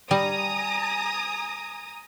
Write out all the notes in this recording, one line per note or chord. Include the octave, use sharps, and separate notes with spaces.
G3 G#5 A#5 D#6